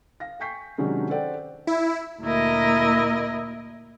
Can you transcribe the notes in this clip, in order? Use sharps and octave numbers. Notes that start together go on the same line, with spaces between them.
F5 A#6
G5 G#5 C#6 G6 B6 C7
C3 D#3 F#3 G#3 C#4 D4
A4 C5 D5 F#5 G5
E4
D2 A#2 A#3 E4 A#4 D#5